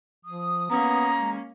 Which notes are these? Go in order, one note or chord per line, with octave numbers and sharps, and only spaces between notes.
F3 D#6
A#3 B3 C#4 A#5
G#3